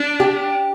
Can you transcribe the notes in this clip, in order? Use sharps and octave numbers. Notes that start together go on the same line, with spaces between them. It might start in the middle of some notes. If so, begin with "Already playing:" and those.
Already playing: D4
G4